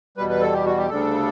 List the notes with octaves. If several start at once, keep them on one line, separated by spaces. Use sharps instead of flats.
E2 B2 G3 B4
B4
A4
G4
F#4
G4
D2 C#3 G3 D4 A4